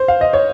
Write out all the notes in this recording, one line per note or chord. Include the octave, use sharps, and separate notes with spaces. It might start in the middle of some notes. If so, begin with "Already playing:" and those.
Already playing: C5
F5
D#5
C#5